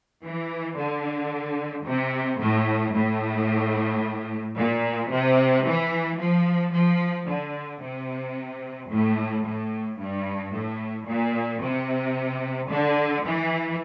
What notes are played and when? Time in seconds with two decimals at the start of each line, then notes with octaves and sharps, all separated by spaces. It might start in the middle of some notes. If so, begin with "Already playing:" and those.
0.23 E3
0.76 D3
1.85 C3
2.40 A2
2.93 A2
4.56 A#2
5.11 C3
5.65 E3
6.19 F3
6.73 F3
7.27 D3
7.82 C3
8.89 A2
9.45 A2
9.98 G2
10.53 A2
11.07 A#2
11.61 C3
12.69 D3
13.24 E3